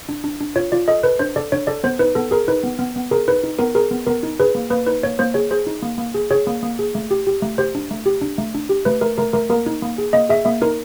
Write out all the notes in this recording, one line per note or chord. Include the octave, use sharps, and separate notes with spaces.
D4
D4
D4
F4 C#5
F4 D5
A4 D#5
A4 B4
D4 C5
A4 D5
D4 C#5
A4 D5
B3 C5
D#4 B4
B3 A4
G#4 A#4
D#4 B4
B3
B3
B3
G#4 A#4
D#4 B4
D#4
B3 A#4
G#4 A#4
B3
B3 A#4
D#4
G#4 B4
A#3
A#3 B4
D#4 B4
A#3 C#5
A#3 C5
G#4 C#5
G#4 C5
D#4
A#3
A#3
G#4
G#4 C#5
A#3
A#3
G#4
A3
G4
G4
A3
G4 C5
D4
A3
G4
D4
A3
D4
G4
A3 B4
A3 A#4
A3 A#4
A3 A#4
A#3 A#4
D#4
A#3
G#4
A#3 D#5
G#4 E5
A#3 E5
D#4 A#4